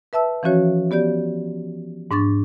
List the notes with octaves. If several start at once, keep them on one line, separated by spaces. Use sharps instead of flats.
B4 E5 A5 E6
E3 F3 C#4 F#4 C#5
B3 G4 D5 G6
G#2 D4 C#6 A6